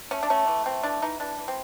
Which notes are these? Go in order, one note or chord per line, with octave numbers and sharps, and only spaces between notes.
A3 C#4
D4
A3 C#4
E3
A3 C4
E3 D4
E3 D#4
E3 D4
E3
C4